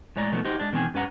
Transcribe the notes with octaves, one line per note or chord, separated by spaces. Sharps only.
A2 G#3 C#5 D5 A#5
B2 D#3 F3 F#3 A3 B3
D#4 F#4 G4 C5
G#3 D4
B2 D#3 E3 C4 D#4 G#4
G2 C#4 B4 F#5 A#5